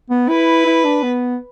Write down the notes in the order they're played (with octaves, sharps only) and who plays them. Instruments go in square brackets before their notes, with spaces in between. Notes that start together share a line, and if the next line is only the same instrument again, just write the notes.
[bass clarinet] B3
[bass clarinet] E4 [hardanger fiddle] B4
[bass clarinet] E4
D4
B3